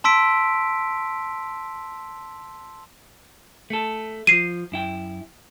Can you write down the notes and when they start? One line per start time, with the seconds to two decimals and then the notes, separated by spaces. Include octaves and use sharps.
0.04 A5 C6 E6 B6 D7
3.70 A3 A4
4.27 F3 F#3 C7 D#7
4.72 F#2 E4 G5